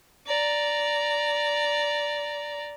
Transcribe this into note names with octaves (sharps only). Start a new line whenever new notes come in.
D5 A#5